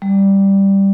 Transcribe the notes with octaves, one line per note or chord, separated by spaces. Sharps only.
G3